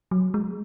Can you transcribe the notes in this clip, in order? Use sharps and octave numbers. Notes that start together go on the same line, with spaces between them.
F#3
G#3